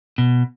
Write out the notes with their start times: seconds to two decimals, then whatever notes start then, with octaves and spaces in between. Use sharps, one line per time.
0.18 B2